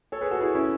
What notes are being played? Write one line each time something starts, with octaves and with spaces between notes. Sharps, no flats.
A4 C#5
G#4 B4
F#4 A4
E4 G#4
C#4 E4